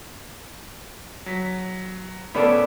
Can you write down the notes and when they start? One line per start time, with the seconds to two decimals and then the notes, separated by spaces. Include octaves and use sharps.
1.26 F#3 B6
2.34 A2 B3 C#4 A4 D5 B5